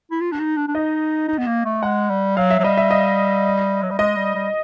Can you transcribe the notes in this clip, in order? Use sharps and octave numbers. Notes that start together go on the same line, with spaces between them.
E4
F4
D4
D#4
D4
D4
D#4 D#5
D#4
B3
A#3
A3
G#3 F#5
G3
F#3 F5
E5
F#3
G3 D#5
E5
D#5
F#3
G3
G#3 D#5
G3
G3